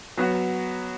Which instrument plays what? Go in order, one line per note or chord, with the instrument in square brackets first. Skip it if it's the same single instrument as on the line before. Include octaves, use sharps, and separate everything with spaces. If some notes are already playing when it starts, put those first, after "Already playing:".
[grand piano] F#3 B3 F#4